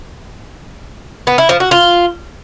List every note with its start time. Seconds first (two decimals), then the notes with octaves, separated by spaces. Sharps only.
1.27 B3
1.38 E4
1.49 F3
1.60 F#4
1.71 F4